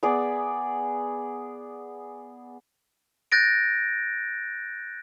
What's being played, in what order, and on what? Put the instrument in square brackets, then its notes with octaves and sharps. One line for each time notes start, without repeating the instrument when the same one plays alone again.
[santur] B3 G#4 D5
[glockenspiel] F#6 G6 A6 A#6 D7